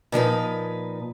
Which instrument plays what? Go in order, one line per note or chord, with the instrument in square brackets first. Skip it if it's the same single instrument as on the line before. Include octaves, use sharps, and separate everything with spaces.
[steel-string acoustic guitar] A#2 F3 D#4 B4